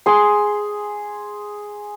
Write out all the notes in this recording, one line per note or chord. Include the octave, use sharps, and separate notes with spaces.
G#4 C6